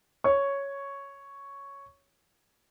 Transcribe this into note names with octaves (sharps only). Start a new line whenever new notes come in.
C#5 C#6